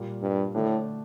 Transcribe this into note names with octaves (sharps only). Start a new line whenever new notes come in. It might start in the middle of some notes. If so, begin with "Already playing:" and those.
Already playing: A#2 G3 A#3
G2
A2 D3 A3 D4